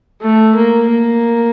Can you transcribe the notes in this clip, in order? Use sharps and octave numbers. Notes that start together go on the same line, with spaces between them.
A3
A#3
A#3